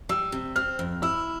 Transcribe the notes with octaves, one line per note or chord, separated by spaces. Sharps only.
G3 E6
C3
C4 F6
F2
E4 E6